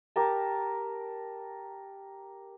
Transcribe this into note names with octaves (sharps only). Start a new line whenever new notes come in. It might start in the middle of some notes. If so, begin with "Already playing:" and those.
G4 A#4 A5